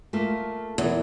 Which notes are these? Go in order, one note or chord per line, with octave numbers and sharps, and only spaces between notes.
A3 A#3 F4
E2 E3 A4 A#4